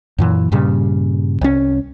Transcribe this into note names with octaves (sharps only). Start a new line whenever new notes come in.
F#2 A#2 E3
G2 A#2 C#3 G3
C2 C#4